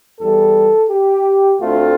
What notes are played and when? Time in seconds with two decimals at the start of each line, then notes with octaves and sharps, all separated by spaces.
0.20 E2 E3 G3 A4
0.90 G4
1.60 D2 D3 A3 C4 F4